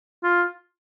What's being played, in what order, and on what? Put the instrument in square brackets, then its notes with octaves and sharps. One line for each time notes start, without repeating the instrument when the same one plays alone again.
[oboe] F4